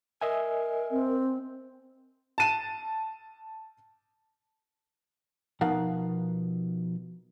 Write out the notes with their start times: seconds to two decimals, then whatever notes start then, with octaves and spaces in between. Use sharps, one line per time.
0.21 A#4 D#5 E5 G#5
0.91 C4
2.38 A5 D#7 E7
5.61 B2 F3 D#4 A#4 F5 F#5